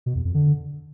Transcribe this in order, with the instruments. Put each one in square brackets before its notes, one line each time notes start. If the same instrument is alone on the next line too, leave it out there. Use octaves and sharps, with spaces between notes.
[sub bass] B2
E2
F2
D3